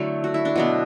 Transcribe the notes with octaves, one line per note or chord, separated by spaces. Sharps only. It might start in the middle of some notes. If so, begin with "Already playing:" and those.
Already playing: D3 F#3 A3 E4
F#4
E4
D4
B2 F#3 B3